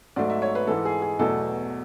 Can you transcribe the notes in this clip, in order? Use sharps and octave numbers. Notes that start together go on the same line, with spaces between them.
G#2 F#3 A3 D5
E5
C#5
B4
G#2 E3 G#3 A4
G#4
G#4
E2 B2 F#3 A3 A4